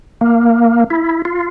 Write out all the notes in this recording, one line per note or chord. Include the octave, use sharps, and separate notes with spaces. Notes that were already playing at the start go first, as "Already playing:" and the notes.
A#3
E4
F4